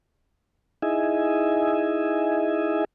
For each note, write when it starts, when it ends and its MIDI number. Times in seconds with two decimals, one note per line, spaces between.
0.82 2.85 63
0.82 2.85 64
0.82 2.85 68
0.82 2.85 75
0.82 2.85 76
0.82 2.85 80